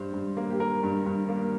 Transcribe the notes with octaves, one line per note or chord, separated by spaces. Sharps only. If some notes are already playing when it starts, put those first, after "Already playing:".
Already playing: G2 G3 C5
G2
A#3
G4
G3 A#4
G2
G2
A#3